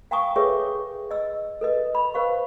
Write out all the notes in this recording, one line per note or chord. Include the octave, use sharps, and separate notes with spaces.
F5 G5 G#5 A#5 C#6 D#6
G#4 A4 B4 C#5 E5 C#6
D#5 E6
A4 B4 D#5
B5
B4 C5 F5 C#6